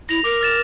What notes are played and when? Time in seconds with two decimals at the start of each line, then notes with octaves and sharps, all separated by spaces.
0.09 E4 A#6 F7
0.24 A#4 D6
0.41 F6 A6 E7